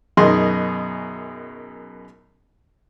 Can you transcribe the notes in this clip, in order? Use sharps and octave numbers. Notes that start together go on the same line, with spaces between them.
F#2 B2 D#3 G#4 D#5 C6